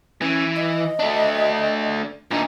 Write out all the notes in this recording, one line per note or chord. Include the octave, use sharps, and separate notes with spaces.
E3 C#4
D#5
A3 D4
A#2 D4 D#4